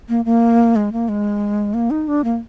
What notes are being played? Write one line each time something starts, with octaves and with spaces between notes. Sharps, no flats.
A#3
A#3
G#3
A#3
G#3
A#3
D#4
D4
A#3